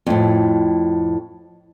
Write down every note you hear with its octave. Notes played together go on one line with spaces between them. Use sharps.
F2 A2